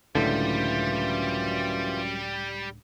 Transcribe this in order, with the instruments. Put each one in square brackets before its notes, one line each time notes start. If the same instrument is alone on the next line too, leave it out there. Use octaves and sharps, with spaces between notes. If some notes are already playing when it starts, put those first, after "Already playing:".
[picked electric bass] C#2 A2 D3 [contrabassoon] F#2 [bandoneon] E3 F4 [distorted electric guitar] G3